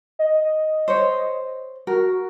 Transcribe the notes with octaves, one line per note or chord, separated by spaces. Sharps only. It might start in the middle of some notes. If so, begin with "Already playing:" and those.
D#5
C5 C#5
F#4 A#4